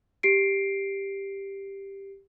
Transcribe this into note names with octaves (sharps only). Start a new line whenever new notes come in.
G4 C7 D7